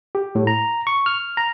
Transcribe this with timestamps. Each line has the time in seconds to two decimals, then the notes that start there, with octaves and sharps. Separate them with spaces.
0.15 G4
0.35 A2
0.47 A#5
0.87 C#6
1.06 F6
1.37 A#5